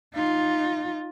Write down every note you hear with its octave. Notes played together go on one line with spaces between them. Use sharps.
D#4 F4